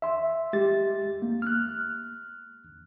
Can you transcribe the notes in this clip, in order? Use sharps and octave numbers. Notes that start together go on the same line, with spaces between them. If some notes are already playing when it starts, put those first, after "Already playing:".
E5 C6
G#3 G4 A6
A#3
F6 F#6